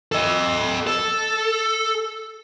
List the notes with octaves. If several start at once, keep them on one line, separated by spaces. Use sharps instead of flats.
A4 D#5
A4